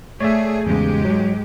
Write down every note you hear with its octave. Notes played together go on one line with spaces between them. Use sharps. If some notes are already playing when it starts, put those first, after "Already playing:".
A3 G#4 C#5 D5 E5
E2 G#2 C#3 G#3 G4
F#3